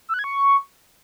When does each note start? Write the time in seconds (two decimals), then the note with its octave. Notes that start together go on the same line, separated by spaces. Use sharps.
0.09 E6
0.14 F#6
0.19 G#6
0.24 C#6